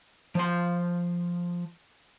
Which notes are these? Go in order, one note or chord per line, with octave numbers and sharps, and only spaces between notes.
F3 C6